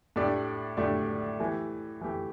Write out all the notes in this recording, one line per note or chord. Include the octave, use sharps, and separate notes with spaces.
A2 A3 D4 G4 D5
A2 A3 D4 G4 D5
E3 A3 G4
E3 A3 G4